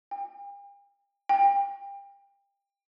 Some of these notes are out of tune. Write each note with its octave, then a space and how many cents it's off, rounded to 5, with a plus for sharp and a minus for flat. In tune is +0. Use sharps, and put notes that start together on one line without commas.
G5 +45
G5 +30